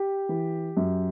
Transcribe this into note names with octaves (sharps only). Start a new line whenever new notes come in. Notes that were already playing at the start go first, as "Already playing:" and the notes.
Already playing: G4
E3
F#2